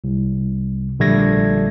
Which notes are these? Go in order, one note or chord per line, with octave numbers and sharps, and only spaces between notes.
C2
A#1 D3 G3 A3 G#6 A#6